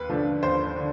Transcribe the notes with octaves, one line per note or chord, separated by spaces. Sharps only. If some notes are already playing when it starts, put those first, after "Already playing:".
Already playing: D#2 B4
D3 F3 A3 D4
D#2 C5
D3